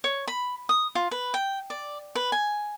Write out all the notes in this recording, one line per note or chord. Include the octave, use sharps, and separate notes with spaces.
C#5
B5
D#6
F4
B4
G5
D5
B4
G#5